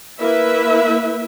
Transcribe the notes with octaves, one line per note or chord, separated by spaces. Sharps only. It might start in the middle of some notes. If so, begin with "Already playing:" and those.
A#3 E4 B4 E5